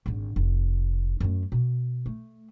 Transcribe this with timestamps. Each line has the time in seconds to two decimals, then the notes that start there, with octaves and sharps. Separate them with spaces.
0.06 G#1 D3
0.36 F1
1.20 F#2 A3
1.52 B2
2.06 A3